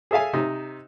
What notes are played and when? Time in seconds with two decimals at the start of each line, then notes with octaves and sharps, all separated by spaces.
0.11 G#4 A4 E5 F5 G#5
0.33 C3 D#4